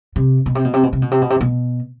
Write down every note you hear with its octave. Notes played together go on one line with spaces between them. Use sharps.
C3
B2
C3
B2
C3
B2
C3
B2
C3
B2
C3
B2